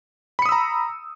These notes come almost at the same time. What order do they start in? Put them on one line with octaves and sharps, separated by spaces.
B5 C#7 D#6 E6 A#5